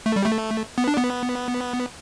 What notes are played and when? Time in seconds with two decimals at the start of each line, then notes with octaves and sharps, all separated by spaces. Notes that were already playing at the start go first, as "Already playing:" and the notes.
0.06 A3
0.16 G3
0.25 A3
0.78 B3
0.88 D4
0.97 B3